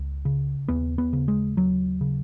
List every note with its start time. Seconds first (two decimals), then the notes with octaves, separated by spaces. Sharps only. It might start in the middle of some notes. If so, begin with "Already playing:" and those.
Already playing: C#2
0.25 C#3
0.68 D#2 B3
0.98 B3
1.13 C#3
1.28 G#3
1.57 D#2 F#3
2.01 C#3